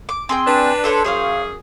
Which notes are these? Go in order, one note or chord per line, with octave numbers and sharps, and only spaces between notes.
D6
C4 G#4 G5
D4 B4
A4 C5 C#5
F#2 G#4 C5 C#5 F5